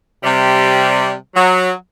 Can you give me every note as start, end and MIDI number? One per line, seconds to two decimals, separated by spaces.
0.24 1.13 48
0.24 1.13 55
1.35 1.70 54